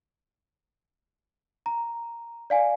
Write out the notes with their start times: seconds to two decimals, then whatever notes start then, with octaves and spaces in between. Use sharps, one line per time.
1.66 A#5
2.50 D5 F5 G#5